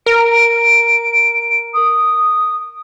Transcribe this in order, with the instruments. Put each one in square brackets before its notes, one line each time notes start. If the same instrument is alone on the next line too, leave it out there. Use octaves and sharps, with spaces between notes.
[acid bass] A#4 [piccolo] D7
[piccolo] D#6